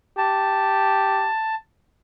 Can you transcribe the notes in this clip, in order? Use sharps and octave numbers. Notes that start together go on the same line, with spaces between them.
G4 A5